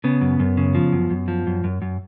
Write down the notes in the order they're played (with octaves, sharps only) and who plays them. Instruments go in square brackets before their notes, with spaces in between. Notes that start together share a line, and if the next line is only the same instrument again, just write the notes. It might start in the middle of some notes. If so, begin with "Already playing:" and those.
[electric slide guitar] C#3 B3
F#2
F#2
C#3
F3
F#2
F#2
F3
F#2
F#2
F#2